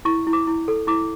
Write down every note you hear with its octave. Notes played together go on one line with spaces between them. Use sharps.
E4 C#6
E4
D6
E4
A4
E4 D6